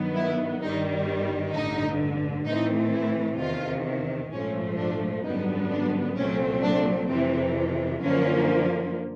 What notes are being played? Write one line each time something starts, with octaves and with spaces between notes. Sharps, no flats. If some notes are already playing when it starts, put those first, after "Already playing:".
Already playing: G2 D#3 F#3 B3
E4
G1 G2 D#3 G3 D#4
A1 G2 D3 D#4
A2 E3 A3 C4 D#4
E4
E2 C3 D#3 F4
A#1 G#2 F3 A3 C#4
D4
G#1 F#2 D3 G3 B3 D#4
D4
C2 A#2 F#3 A3 C4 C#4
D4
F2 C3 E3 C4
F#2 D3 F3 A#3 C#4